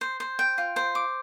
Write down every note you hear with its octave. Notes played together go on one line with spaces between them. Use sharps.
C5
C5
G5
F4
C5
D6